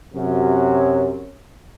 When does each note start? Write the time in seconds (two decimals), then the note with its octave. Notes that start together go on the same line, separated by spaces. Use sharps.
0.14 F#2 C3 F#3